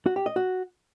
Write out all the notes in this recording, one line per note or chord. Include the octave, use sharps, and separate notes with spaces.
F#4
G4
D#5
F#4